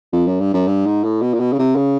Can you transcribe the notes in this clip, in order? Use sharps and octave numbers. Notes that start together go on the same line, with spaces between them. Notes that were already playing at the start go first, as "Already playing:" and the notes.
F2
F#2
G2
F#2
G2
G#2
A2
B2
A#2
B2
C#3
C3
C#3